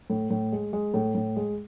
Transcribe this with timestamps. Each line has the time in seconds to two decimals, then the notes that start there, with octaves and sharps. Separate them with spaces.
0.10 A2
0.30 A2
0.52 G#3
0.73 G#3
0.94 A2
1.15 A2
1.36 G#3